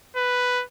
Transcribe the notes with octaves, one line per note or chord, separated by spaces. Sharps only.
B4